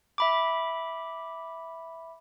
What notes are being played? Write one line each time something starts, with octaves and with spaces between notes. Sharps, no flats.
E5 B5 D6